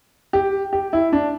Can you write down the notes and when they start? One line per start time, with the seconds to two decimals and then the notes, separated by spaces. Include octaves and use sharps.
0.33 G4
0.73 G4
0.93 E4
1.12 D4